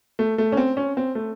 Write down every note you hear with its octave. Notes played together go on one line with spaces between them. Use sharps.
A3
A3
C#4
C4
C#4
C4
A3